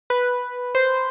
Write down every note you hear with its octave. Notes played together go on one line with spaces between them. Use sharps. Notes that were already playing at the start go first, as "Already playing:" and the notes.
B4
C5